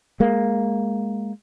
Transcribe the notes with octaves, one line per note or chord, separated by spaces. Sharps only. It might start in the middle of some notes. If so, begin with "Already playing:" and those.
G#3 A#3